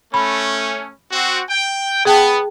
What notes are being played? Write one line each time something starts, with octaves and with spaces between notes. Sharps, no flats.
A3 C#4 B5
C4 F#4
G5
B3 G#4 G5 A5